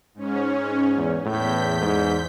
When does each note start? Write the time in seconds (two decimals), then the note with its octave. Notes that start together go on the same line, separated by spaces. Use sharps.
0.14 G#2 C#4
0.96 E2
1.25 E2 A2 G6 B6
1.81 G#2